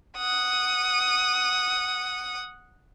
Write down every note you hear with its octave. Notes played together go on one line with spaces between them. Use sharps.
F#5 D#6